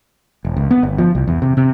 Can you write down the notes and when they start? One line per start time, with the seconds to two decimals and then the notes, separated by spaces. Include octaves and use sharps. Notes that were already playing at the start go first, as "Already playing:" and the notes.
0.45 E1
0.56 C#2
0.71 B3
0.83 G1
0.98 F3
1.15 C2
1.28 E2
1.42 C3
1.57 C3